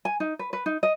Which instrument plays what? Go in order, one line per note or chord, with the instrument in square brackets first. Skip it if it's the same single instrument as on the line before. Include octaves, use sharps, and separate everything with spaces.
[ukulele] G#5
D#4
B4
B4
D#4
D#5